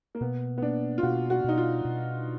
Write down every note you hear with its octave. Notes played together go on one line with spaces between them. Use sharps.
A#3
B2 B3
B3
A#3 D4
F4
B2 F#4
F#4
B2 D#4
F4
B2